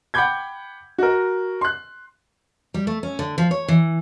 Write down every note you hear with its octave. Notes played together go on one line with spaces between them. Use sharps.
F#5 G5 B5 D6 G6 G#6
F#4 A#4
C6 F#6
G3
A3
C#4
D3
F3
C#5
E3